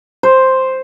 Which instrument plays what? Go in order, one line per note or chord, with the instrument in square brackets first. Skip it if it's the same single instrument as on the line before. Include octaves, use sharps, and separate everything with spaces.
[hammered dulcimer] C5